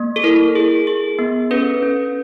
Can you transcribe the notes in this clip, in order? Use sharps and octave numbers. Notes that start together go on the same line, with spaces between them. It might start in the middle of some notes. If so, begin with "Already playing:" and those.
Already playing: A#3
A4
E4 A#4
G#4
G#4
B3
C#4 A4 B4
C#4